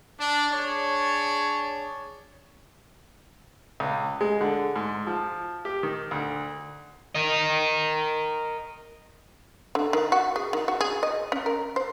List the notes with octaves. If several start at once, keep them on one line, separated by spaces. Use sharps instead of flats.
D4
D4 G#4 C#5
C#2
G#3
D3
G#2
F3
G4
D#3
D2
A#4 D#5
D3
D#3
F#4
G#4
D#3
F#4
G#4
D#5
C#4
A#4
C5